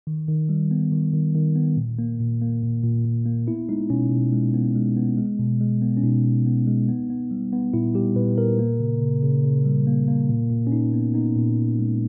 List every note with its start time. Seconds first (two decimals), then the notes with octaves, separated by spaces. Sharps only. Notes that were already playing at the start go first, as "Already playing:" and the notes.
0.07 D#3
0.28 D#3
0.49 G3
0.71 B3
0.92 D#3
1.13 D#3
1.35 D#3
1.56 B3
1.77 A#2
1.99 A#3
2.19 A#2
2.41 A#3
2.63 A#2
2.84 A#2
3.05 A#2
3.26 A#3
3.47 B3 E4
3.69 G#3 D#4
3.90 B2 C#4
4.11 B2
4.33 G#3
4.54 B3
4.76 G#3
4.97 B3
5.17 G#3
5.39 B2
5.61 G#3
5.82 B3
5.97 C#4
6.03 B2 D#4
6.25 B2
6.46 B3
6.67 G#3
6.89 B3
7.10 B3
7.31 G3
7.52 B3
7.74 A#2 E4
7.95 G3 G4
8.16 A#2 B4
8.38 A#2 A#4
8.59 A#3
8.80 C#3
9.01 C#3
9.22 C#3
9.44 C#3
9.65 G3
9.87 A#3
10.08 A#3
10.29 A#2
10.50 A#2
10.67 C#4
10.72 A#2 D#4
10.93 B3
11.14 B3 D#4
11.36 A#2
11.57 A#2
11.79 G#3